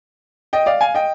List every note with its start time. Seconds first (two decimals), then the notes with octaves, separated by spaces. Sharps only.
0.53 D#5 G5
0.66 D5 F5
0.81 F5 G#5
0.94 D#5 G5